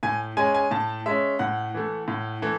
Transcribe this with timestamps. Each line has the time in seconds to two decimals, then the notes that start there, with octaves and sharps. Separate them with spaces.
0.03 A2 G#5
0.37 G#3 C#4 G#5
0.54 G#5
0.71 A2 A5
1.06 G#3 C#4 E5
1.39 A2 F#5
1.74 E3 A3
2.08 A2
2.42 E3 A3